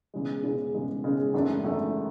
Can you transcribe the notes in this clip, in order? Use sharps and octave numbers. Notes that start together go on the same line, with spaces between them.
E1 E2 C#3 G#3
E1 E2 C#3 G#3
E1 E2 C#3 G#3
E1 E2 C#3 G#3
G#1 F#2 E3 A3 D4
G#1 F#2 E3 A3 D4